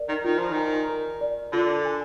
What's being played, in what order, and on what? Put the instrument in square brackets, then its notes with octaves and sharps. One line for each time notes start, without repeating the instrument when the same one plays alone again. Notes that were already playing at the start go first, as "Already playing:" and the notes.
Already playing: [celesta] A#4 D5
[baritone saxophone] D#3
[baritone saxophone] D#3 [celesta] F4
[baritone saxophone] F3
[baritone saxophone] D#3 [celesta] G#5
[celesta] A#4
D5
[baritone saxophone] D3 [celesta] F4
[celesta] G#5